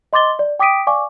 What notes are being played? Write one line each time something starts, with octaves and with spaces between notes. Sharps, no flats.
D#5 C6 D6 A6 G7
D5
G5 D6 D#6 B6 D7 D#7
D5 F5 G#5 C#6 D6